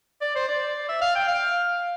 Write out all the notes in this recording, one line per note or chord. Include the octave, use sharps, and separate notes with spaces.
D5
C5
D5
E5
F5
G5
F5